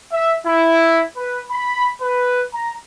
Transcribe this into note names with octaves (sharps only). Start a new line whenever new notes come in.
E5
E4
B4
B5
B4
A#5